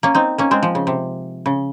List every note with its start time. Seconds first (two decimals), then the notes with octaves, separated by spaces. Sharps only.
0.03 A#3 C#4
0.15 C4 D#4
0.38 A#3 C#4
0.51 G#3 C4
0.63 F3
0.75 C#3
0.87 C3
1.46 C#3